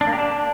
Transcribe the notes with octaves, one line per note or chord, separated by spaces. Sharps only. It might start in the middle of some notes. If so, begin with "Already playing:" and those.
D4
A#3
G4
D4